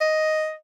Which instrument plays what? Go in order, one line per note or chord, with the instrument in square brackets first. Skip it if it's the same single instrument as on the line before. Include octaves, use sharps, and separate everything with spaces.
[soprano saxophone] D#5